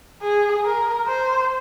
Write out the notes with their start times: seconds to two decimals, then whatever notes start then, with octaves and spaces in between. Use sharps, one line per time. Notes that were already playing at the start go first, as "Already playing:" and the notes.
0.22 G#4
0.65 A#4
1.07 C5